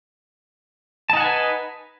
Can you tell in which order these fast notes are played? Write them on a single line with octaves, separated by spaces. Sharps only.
A5 D#4 F#5 G#5 B4